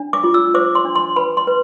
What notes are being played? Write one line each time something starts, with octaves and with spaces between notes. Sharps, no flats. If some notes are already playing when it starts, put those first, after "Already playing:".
Already playing: D4
D6
F4
E6
C5 D6
C6
D4
C6
B4 B5
C6
B4